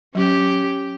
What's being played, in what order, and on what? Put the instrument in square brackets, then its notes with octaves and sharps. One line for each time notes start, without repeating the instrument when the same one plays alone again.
[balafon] F#3 [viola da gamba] C#4 G4